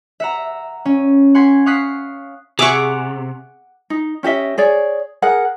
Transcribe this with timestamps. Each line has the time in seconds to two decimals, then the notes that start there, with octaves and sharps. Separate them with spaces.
0.20 E5 F#5 A#5
0.85 C#4
1.35 F#5 G#5 C6 C#6 G#6 B6
1.66 F5 C#6 D#6 F#6 B6 C7
2.59 C3 G#4 E5 F#5 C#6 D6
3.90 D#4
4.23 C#4 G4 D#5 E5
4.58 G#4 C#5 D5
5.22 G#4 A#4 F#5